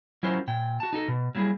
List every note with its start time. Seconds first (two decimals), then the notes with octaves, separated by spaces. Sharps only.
0.23 F#3 C#4 E4 F4 A#4 C5
0.48 A#2 G5
0.80 F#4 A5
0.93 D#4 F#4 A4
1.08 B2
1.35 F#3 G3 A#3 E4 G#4